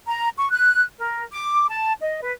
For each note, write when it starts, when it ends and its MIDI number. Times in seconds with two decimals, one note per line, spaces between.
0.06 0.28 82
0.38 0.48 85
0.51 0.82 90
0.98 1.22 70
1.32 1.66 86
1.69 1.94 81
2.01 2.20 75
2.23 2.32 71